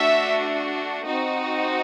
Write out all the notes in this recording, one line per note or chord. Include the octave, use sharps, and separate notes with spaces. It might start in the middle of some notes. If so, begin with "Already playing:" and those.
Already playing: A3 D4 F#4 E5
C4 D#4 F#4